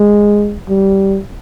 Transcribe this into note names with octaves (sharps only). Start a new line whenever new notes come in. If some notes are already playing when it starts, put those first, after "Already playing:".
Already playing: G#3
G3